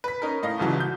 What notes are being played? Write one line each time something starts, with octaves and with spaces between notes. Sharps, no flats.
B4 B6
C#4 D#4 A#4
A2 D#5 F5
G1 C2 C#3 E3 F#3
G6